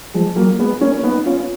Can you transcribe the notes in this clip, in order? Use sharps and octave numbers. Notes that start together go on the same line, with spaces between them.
F3 G#3
F#3 A#3
G#3 B3
A#3 C#4
B3 D#4
C#4 F4